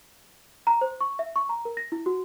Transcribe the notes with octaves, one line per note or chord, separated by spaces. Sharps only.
A#5
C5
C#6
E5
C#6
A#5
A#4
A#6
E4
F#4